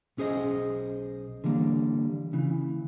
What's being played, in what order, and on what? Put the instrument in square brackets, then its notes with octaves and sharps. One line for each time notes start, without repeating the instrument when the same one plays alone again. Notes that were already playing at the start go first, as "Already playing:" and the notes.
[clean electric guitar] B1 C#4 G#4 C5 D#5
D3 E3 G3 A#3
C#3 E3